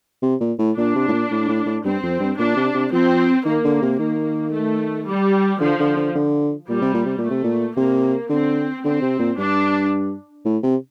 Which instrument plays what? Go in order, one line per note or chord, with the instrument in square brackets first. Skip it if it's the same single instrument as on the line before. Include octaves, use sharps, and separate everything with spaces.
[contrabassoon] C3
A#2
A2
[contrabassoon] A#2 [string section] D4
[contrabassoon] C3
A2
A#2
A2
A2
A2
[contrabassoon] G2 [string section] C4
[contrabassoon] F2
G2
[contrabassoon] A#2 [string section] D4
[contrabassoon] C3
C3
[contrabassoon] F3 [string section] C4
[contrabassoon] D#3 [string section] A#3
[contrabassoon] D3
C3
[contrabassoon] D#3 [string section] A#3
[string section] A3
G3
[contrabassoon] D3 [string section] F3
[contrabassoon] D3
D3
D3
[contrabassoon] A#2 [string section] G3
[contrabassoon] C3
A#2
C3
[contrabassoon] A#2 [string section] A3
[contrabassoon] C3
A#2
[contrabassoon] C3 [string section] A#3
[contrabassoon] D3 [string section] C4
[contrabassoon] D3 [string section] C4
[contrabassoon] C3
A#2
[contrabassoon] G2 [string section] D4
[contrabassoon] A2
C3